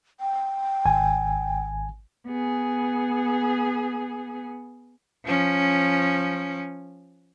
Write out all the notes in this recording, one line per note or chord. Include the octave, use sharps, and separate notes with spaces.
G5
G#1 G#5
B3 G#4
F3 C#4